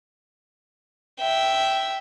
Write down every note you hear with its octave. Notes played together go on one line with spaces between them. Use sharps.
E5 G5